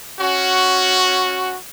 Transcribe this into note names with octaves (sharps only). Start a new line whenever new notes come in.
C#4 F#4